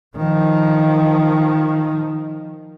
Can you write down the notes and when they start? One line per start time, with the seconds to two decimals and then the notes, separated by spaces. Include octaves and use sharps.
0.16 D#3 F3